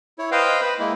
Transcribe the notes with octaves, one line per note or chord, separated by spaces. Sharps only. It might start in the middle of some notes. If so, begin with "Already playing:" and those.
E4 C#5
B4 C5 D#5 F5 G5
B4 B5
G#3 A#3 E4